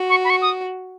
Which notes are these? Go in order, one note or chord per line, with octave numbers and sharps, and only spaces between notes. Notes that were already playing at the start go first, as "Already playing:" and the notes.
Already playing: F#4
C#6
B5
C#6
D#6